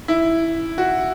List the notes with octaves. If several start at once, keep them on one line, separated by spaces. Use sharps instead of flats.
E4
F#4